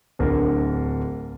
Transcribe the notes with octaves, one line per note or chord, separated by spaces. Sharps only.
D1 D3 A#4